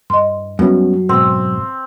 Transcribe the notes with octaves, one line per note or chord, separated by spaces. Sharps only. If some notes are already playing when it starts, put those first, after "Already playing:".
G2 D#5 C6
F#2 G3 B3 C#4
G#2 B2 C4